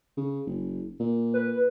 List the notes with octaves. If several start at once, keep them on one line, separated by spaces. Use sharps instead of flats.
C#3
F#1
A#2
B4